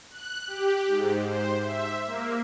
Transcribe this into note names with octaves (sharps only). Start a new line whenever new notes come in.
F#6
G4
G#2
C5
E5
A#3